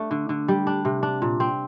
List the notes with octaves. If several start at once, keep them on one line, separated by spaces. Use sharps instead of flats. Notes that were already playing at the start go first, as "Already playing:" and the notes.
Already playing: A3 D4
D3
D3
G3
D4
C3
D4
A#2
C4